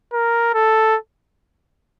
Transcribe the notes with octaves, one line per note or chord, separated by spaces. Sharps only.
A#4
A4